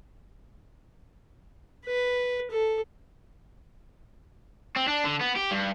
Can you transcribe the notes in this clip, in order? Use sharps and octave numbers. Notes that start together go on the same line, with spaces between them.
B4
A4
C4
D4
D3
B3
G4
G2